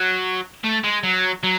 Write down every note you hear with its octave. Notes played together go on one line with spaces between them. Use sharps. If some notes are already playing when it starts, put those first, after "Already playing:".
Already playing: F#3
A3
G#3
F#3
F#3